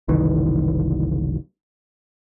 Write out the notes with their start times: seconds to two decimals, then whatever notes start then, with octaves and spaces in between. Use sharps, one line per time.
0.08 F#1 C2 D#3 E3